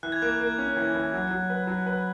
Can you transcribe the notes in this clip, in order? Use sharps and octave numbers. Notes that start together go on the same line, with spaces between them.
E3 F#6
G#6
A#3 F#6
A#3
C#4
E3
E3
F#3
F#3
B4
F#3
B4